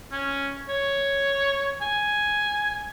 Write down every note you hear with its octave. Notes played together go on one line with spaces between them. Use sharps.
C#4
C#5
G#5